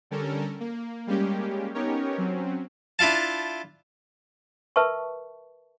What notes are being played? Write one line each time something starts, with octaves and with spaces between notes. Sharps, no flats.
D3 G3 C#4 A4 A#4
A#3
G3 G#3 A#3 C#4 G4
B3 C#4 D#4 G4 A#4 C#5
F#3 C4 C#4
D4 E4 F4 F5 A5
A#4 B4 E5 A5 C#6